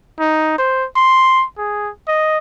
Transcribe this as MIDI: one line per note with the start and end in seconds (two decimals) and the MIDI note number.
0.20 0.54 63
0.58 0.85 72
0.96 1.45 84
1.58 1.90 68
2.08 2.38 75